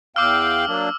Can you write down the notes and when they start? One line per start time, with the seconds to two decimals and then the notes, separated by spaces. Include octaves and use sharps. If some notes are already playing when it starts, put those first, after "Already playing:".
0.16 E2 F5 G5 D6 E6 F6
0.68 F#3 A#3 D4